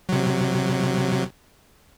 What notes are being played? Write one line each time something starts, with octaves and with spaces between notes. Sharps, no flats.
C3 F#3